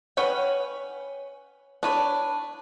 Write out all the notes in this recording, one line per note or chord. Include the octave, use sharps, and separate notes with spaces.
C#4 B4 C#5 F#5 G5
D4 B4 C#5